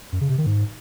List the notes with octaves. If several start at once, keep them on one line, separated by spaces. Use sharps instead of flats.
F#2
C#3
C3
D#3
G#2